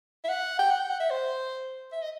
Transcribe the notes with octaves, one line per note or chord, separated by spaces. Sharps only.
E5
F#5
G5
F#5
G5
F#5
E5
C5
E5
D#5